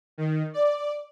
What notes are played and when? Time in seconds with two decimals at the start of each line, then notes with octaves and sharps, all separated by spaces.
0.18 D#3
0.53 D5